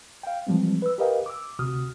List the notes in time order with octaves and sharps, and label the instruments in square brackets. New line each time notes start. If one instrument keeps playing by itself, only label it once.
[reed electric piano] F5 G5
E3 F3 G3 G#3 C4
B4 E6
G4 A#4 B4 D#5 F5 G5
D6 E6
D2 C3 F#4 D#6 F6